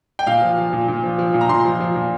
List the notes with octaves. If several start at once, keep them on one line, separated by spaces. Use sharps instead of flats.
G5
A#2 F5
F3
F3
A#2
A#2
F3
F3
A#2
A#5
A#2 C6
F3
F3
A#2